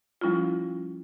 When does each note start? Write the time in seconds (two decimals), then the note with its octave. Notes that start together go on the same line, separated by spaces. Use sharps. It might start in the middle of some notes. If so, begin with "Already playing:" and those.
0.21 F3 G3 C#4 E4 F4